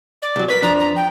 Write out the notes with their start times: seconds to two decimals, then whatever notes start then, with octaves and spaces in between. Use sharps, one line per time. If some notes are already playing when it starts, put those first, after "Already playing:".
0.22 D5
0.36 C2 F#3
0.48 A#4 B4 C#5 B6
0.62 F2 F3 D4 A#5
0.79 A#5
0.96 G5